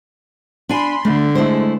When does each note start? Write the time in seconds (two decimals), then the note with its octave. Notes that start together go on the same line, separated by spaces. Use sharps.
0.69 D4 G#5 B5 C6
1.05 D3 A3
1.35 G#3 A3 E4 C5